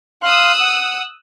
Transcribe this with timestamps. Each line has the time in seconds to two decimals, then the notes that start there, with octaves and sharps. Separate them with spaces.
0.23 F5 C6 D#6 E6 F#6
0.60 F#5